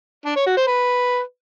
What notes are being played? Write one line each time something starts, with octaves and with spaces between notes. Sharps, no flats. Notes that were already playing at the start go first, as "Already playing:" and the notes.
D4
C#5
F#4
C5
B4